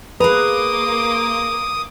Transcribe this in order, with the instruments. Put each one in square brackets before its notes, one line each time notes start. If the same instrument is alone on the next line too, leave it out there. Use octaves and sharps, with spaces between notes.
[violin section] A#3 C6 D6 [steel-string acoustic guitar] G#4 A#5 [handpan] B4 [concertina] D#6